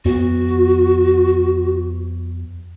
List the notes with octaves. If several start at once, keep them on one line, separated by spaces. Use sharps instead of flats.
F2 B3 F#4